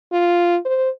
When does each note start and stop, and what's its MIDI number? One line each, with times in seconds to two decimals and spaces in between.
0.12 0.57 65
0.65 0.89 72